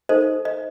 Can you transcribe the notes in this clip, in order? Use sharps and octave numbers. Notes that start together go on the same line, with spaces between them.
D#4 A4 C5 D#5
D#5